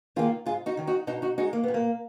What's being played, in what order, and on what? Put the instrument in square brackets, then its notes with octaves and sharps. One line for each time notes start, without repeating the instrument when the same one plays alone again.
[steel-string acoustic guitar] D#3 A#3 F4 G#4
G#2 F4 G#4
D#4 F#4
D#3 F#3
D#4 F#4
B2 D#4 F#4
D#4 F#4
G#3 D#4 F#4
A#3
A#2 B3
A#3